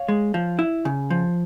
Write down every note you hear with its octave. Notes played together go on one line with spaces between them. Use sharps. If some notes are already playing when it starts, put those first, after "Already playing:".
Already playing: C#5 F5
G#3
F3
E4
C#3
F3